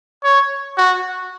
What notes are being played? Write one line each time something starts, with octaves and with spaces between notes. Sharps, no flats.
C#5
F#4